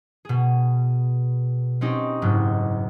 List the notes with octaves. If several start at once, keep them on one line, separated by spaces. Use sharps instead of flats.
B2 G#4
C4 C#4 D#4 G4
F#1 G#2